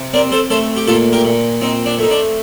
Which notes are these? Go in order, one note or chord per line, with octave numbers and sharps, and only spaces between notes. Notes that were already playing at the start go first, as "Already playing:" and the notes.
Already playing: C3
C4 A#4 D5
A4 C5
A3 A4 C5
G4
A#2 F4 A4
G4 A#4
A#2
C4 D#4
D4
A3 D#4
D4